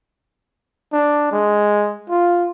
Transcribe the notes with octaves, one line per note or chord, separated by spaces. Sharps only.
D4
G#3
F4